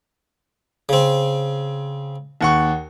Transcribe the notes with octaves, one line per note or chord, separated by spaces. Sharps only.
C#3 C4
D#2 F#5 C#6